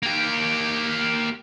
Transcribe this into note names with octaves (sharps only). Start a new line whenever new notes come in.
A#3 G4